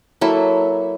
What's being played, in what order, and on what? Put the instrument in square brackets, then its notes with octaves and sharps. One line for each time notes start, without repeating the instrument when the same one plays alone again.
[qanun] F#3 A#3 E4 A4